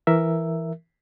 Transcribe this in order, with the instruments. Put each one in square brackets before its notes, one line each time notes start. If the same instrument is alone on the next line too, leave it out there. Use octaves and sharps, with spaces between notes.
[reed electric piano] E3 A#4 E5